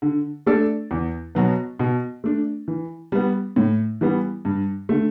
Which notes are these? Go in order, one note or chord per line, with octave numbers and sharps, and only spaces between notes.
D3
A3 D4 A4 D5
E2
B2 F#3 B3
B2
A3 D4
E3
G3 B3
A2
E3 G3 B3
G2
D3 A3